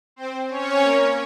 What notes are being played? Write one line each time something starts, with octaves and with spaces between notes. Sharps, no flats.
C4 C5
C#4 C#5
A#3 A#4